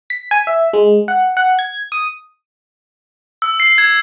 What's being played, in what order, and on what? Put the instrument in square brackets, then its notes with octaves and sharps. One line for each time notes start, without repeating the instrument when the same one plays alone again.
[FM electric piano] B6
G#5
E5
G#3
F#5
F#5
G#6
D#6
[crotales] E6
C7
G#6